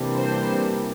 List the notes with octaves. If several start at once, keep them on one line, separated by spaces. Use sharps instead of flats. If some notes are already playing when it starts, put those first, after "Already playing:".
Already playing: C3 E3 G3 A#3 D4
C5